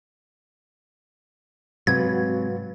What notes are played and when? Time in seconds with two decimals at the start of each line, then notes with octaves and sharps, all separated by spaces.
1.87 G#2 C3 F#3 F#4 B4 F5 G#6